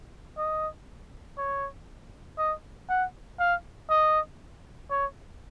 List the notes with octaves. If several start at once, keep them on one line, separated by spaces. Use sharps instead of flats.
D#5
C#5
D#5
F#5
F5
D#5
C#5